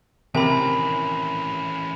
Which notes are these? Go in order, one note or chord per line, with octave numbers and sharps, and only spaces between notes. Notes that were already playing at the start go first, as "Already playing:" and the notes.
C3 D#3 E3 C#4 G4 A#4 G#5 B5